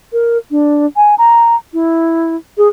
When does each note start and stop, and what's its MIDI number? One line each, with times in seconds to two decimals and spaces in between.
0.13 0.38 70
0.51 0.86 62
0.96 1.15 80
1.18 1.56 82
1.73 2.36 64
2.58 2.68 68